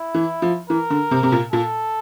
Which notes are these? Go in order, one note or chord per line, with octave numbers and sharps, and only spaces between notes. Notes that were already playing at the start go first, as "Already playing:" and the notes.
Already playing: E4
E3
F3
E3 A#4
D3
C3
C3
A#2
A#2 A4